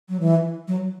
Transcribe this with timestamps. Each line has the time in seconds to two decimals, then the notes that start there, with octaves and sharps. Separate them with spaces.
0.09 F#3
0.20 E3
0.68 F#3